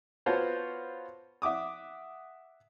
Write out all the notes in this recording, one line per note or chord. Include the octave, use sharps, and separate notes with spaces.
B3 F4 F#4 C5 C#5 A5
E5 F#5 D6 D#6